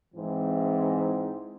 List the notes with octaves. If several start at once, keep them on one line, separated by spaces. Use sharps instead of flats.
G#2 E3 C4 E4